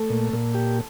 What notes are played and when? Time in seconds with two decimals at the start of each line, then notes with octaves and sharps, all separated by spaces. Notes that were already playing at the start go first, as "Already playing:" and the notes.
Already playing: A3 A4
0.10 A#2
0.33 A#2
0.54 G4